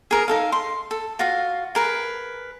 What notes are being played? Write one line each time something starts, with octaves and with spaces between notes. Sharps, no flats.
G#4 A#4 D#5
D#4 A4 F5
C6
A4
F4 F#4 F5
G#4 A#4 B4